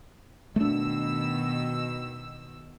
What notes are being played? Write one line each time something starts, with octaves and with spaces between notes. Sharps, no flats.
B2 D#3 A3 D4 E6